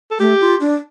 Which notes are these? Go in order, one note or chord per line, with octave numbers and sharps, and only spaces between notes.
A4
A3 G4
F4
D4